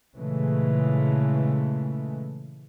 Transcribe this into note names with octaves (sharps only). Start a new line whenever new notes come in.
A#2 C#3 E3 G#3 A3